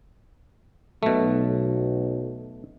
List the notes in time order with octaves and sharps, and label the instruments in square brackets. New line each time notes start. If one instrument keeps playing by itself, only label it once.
[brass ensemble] B1 [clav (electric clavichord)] B2 A3